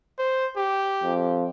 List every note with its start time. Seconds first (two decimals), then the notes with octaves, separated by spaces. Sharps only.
0.19 C5
0.57 G4
1.03 F2